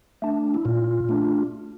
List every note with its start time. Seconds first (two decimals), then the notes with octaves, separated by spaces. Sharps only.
0.22 A3 D4
0.54 E4
0.65 A#2 F4
1.09 A3 D4